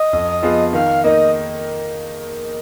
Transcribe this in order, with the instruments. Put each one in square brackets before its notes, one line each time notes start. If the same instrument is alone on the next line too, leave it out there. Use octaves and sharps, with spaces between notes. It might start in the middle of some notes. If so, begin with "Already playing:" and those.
Already playing: [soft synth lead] D#5
[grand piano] F2
F3 B3 F4 G#4
[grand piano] D#3 [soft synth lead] F5
[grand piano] A#3 D#4 [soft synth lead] D#5